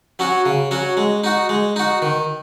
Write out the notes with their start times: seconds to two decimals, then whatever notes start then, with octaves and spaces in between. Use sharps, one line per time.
0.19 F#3 C#4 F#4
0.46 C#3
0.71 F#3 C#4 F#4
0.97 G#3
1.24 D#4 F#4
1.49 G#3
1.76 D#4 F#4
2.02 D#3